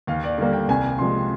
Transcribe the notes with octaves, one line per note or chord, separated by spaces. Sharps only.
D#2 F5
D5
D3 G3 A#3
G5
C2 G#5
C3 F3 G#3 C6